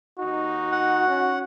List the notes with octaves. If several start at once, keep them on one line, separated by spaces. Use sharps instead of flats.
D#2 D#4 F#4
F#5
C#4